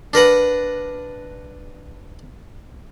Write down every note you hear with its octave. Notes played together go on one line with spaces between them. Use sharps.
D4 A#4 B4 F#5